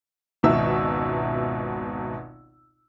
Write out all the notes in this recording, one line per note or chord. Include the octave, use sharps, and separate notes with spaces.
G#1 C#2 B2 E5 E6